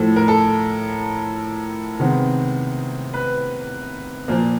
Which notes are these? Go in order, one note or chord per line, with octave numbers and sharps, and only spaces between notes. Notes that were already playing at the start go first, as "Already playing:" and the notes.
Already playing: A2 F3 A3 A4
A#4
A4
C3 D#3 G#3 B3
B4
A#2 F3 A#3